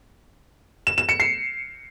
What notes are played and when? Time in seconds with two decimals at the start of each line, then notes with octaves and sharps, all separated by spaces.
0.87 E7
0.98 E7
1.09 C#7
1.20 C7